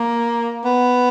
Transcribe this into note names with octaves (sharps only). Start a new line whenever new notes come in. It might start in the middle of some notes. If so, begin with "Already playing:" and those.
Already playing: A#3
B3